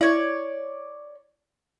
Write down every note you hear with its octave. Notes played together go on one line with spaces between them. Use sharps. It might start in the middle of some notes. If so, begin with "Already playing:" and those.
E4 C#5 D5